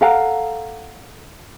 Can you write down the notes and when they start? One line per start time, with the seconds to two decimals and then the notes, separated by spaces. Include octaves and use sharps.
0.01 A4 F5 F#5 A#5